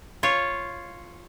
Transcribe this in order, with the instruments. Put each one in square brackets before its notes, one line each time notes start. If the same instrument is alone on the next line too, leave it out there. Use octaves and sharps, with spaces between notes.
[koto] F4 C#5